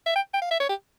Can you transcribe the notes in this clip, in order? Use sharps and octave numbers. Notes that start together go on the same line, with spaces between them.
E5
G5
G5
F5
E5
C#5
G4